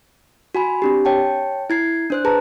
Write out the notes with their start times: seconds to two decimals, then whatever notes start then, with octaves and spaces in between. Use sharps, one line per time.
0.55 F#4 G#5 B5
0.82 C4 D4 G4
1.05 C#5 G5 A5
1.70 E4 G#6 C7
2.10 D4 C5 F#6
2.25 G#4 B4 C5 A5 A#5